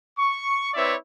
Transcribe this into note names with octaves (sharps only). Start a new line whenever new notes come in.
C#6
C4 E4 B4 C#5 D5 E5